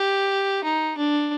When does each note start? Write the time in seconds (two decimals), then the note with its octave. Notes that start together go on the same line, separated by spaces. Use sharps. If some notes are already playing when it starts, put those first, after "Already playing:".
Already playing: G4
0.64 D#4
0.97 D4